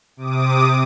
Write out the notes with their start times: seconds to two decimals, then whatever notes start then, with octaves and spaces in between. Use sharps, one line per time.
0.17 C3 D6 D#6